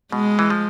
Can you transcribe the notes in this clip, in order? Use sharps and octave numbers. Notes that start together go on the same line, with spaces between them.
B2 G#3
E3
F3